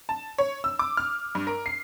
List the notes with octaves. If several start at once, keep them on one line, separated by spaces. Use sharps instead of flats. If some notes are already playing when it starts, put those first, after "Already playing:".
A5
C#5
E6
D6
F6
G2
A#4
C7